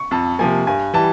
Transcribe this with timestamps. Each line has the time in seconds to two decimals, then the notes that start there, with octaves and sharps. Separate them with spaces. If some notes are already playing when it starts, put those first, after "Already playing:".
Already playing: C#6
0.11 F2 A5
0.39 C3 F3 A#3 G#5
0.67 G2 G#5
0.94 E3 G3 A5